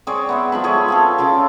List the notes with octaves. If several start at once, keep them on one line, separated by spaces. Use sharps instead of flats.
C4 G#4 C#5 D5
B3 E5 C6
F3 G#3 B5
G#4 A4 C#5 E5
C4 F4 A4
C#3 F4 G5 D6